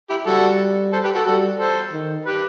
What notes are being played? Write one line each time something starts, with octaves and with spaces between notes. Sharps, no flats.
E4 G4
G3 F#4 A4
A4 C5
G4 B4
F#4 A4
G3 F#4 A4
A4 C5
D#3
G4 B4